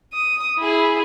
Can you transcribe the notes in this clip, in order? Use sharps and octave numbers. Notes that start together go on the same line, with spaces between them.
D#6
E4 G#4